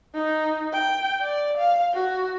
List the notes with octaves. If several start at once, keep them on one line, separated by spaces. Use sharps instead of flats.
D#4
G5
D5
F5
F#4